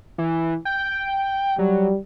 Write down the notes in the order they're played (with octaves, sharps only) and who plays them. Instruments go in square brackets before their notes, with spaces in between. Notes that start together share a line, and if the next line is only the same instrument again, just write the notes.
[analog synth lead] E3
G5
[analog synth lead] F#3 [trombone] G3